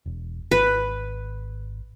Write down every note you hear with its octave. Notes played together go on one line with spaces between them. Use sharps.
E1
G#1 B4